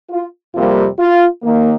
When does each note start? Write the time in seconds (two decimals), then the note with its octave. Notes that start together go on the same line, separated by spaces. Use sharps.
0.10 F4
0.54 F2 C3 G3 A#3 F4
0.99 F4
1.43 D#2 D#3 A#3